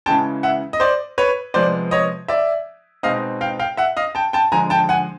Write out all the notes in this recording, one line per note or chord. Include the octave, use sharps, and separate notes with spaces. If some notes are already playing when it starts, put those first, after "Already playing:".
C#3 E3 G#3 C#4 G5 A5
E5 F#5
D#5
C5 D5
B4 C#5
C3 F3 G#3 B3 C5 D5
C#5 D#5
D5 E5
B2 G#3 C4 D#4 D#5 F5
F5 G5
F5 G5
E5 F#5
D#5 F5
G5 A5
G5 A5
D3 F3 G#3 G#5 A#5
G5 A5
F#5 G#5